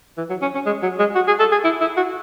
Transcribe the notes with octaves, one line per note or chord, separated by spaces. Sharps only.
E3
F#3
C#4
C#4
G#3
F#3
G#3
F#4
G#4
A4
G#4
E4
E4
F#4